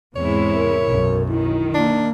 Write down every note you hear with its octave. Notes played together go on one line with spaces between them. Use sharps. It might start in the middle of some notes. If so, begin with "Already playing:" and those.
E2 G#2 C3 G#3 E4 C#5
A#4
B1 F#2
D#3 E4
A#3 D4